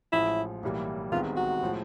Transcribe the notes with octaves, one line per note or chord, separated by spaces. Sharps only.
A1 A2 F3 G#3 E4
B1 A2 E3 G3 A#3
C2 C3 D#3 G#3 B3 F4
F#4
A2 F3 G#3